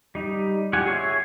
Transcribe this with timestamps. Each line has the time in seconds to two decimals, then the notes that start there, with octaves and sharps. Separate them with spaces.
0.15 G3 D#4
0.73 F4 G4 F#5 G#5
0.86 G#4 C#5 E5 G#5